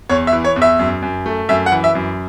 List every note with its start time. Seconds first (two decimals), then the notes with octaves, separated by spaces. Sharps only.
0.09 E2 C#5
0.27 E5
0.32 E3
0.44 C#5
0.56 E2
0.62 E5
0.79 F#2
1.02 F#2
1.26 A3
1.49 F#2 E5
1.66 F#5
1.72 E3
1.84 E5
1.95 F#2